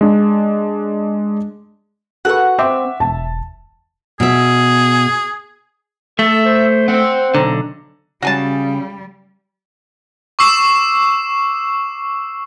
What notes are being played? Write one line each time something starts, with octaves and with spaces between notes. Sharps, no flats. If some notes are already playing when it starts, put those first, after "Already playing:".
G#3 D4
F#4 A4 B4 F#5 C#6
C4 E5 D6
E1 A5
B2 G#4 E5
A3 A4 E5
C5
C4 F#5
B1 D3 A#5
C#3 G3 F#4 G#5 A5
C#6 D6 E6 C7 E7